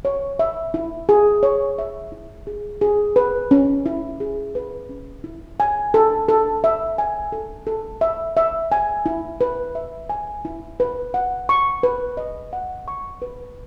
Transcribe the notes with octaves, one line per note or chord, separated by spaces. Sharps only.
C#5
E5
E4
G#4
C#5
E5
E4
G#4
G#4
B4
C#4
E4
G#4
B4
C#4
E4
G#5
A4
A4
E5
G#5
A4
A4
E5
E5
G#5
E4
B4
E5
G#5
E4
B4
F#5
C#6
B4
D#5
F#5
C#6
B4